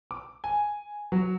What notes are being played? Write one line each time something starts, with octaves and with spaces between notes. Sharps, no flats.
D6
G#5
F#3